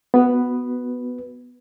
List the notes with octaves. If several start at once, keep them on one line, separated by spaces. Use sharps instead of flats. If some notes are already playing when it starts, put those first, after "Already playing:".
B3 F#4 B4